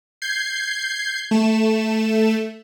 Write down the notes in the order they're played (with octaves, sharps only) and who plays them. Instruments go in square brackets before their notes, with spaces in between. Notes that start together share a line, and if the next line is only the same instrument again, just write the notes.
[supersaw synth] G6 G#6 C7
A3 E7